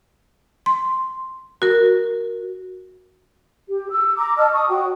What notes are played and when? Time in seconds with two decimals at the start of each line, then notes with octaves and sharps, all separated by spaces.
0.66 C6
1.62 F#4 A#4
3.69 G4
3.89 E6
4.16 A#5 D6
4.37 D#5 A5 E6 F6
4.51 C#6 D#6
4.69 F#4 C#5 G5